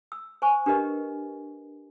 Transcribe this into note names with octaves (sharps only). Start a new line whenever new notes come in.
E6
C5 G#5 C#6
D4 G4 A#4 B4 D#5